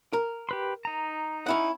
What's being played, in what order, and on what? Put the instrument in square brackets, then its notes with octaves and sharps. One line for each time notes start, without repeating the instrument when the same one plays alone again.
[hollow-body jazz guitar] A#4
[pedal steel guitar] G4 B4 C6
D#4 A#5
[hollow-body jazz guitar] C#4 E4 F#5